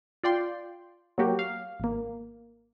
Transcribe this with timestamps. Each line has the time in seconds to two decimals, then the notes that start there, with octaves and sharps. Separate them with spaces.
0.24 F4 D5 G5 C6
1.18 F#3 A#3 F#4 G4
1.39 F5
1.80 G#1 A#3